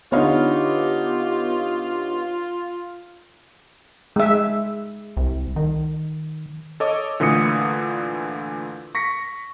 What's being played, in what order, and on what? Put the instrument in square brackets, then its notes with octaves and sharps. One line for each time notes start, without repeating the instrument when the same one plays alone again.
[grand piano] D3 D#4 C#5 [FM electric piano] B3 B4 F5 [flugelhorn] F4 [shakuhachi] G4
[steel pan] G#3 E5
[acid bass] C2
D#3
[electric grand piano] A4 C#5 D#5 D6
A#2 D3 E3 A3 D#6 C#7
C#6 A#6 B6 C#7